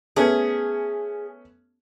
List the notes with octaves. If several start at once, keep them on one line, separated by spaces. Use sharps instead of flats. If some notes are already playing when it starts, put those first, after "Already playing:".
A3 B3 C#4 G#4